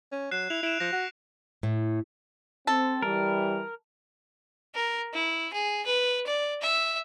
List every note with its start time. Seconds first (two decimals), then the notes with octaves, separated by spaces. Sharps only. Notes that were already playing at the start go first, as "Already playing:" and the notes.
0.12 C#4
0.31 F#3 F#6 C7 E7
0.50 E4 F7
0.63 E4 D7 E7
0.80 F3 A#6 C#7
0.93 F#4
1.63 A2
2.67 C4 A4
3.03 E3 G3 A#4
4.75 A#4
5.13 E4
5.53 G#4
5.86 B4
6.26 D5
6.62 E5